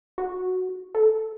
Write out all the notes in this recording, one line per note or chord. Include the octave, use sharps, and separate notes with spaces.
F#4
A4